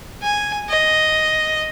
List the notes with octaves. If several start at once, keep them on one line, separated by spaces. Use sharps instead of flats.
G#5
D#5